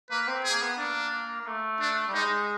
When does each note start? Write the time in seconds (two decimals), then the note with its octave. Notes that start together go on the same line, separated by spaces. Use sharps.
0.10 A#3 B4
0.27 C4
0.45 G#4
0.50 A#3
0.62 B3
0.78 A#3 D4
1.41 A#3
1.47 A3
1.80 D4
2.07 G3
2.14 G#3 D#4